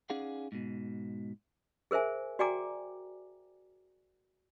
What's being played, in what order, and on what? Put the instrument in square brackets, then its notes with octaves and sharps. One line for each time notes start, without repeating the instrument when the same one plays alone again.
[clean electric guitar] C#4 D#4 G#4 D5 F5 F#5
G#2 B2
[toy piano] G#4 A#4 C5 E5 G#5
F#4 D5 G5 G#5 A#5 D6